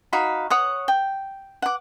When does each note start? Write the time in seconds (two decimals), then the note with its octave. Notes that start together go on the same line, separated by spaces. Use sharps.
0.13 D#4 F#4 F5 B5
0.50 C#5 F#5 D#6
0.88 G5
1.62 F#5 D6